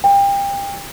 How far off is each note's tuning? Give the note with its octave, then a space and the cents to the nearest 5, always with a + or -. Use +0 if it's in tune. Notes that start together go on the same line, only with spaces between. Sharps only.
G5 +30